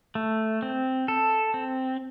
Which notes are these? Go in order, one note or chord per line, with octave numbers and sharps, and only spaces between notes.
A3
C4
A4
C4